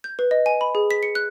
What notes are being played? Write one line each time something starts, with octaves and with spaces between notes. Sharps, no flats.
G6
B4
D#5
G#5
B5
G#4
B6
C#7
F#6